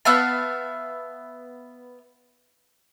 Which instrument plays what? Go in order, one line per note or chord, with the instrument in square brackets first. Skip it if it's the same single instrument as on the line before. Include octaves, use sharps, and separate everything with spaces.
[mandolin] B3 E5 F5 A5